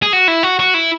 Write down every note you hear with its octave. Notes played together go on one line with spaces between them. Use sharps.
G#4
F#4
E4
F#4
F#4
E4